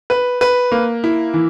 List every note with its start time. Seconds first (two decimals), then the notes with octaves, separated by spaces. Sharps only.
0.10 B4
0.41 B4
0.72 A#3
1.04 E4
1.34 E3